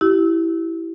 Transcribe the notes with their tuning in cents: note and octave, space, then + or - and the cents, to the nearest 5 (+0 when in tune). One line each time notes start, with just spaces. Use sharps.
E4 +0 G4 -25